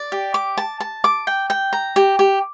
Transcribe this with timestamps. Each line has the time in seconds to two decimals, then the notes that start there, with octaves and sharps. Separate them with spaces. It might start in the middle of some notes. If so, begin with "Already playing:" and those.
Already playing: D5
0.12 G4
0.34 D6
0.57 A5
0.80 A5
1.04 D6
1.27 G5
1.50 G5
1.73 A#5
1.96 G4
2.19 G4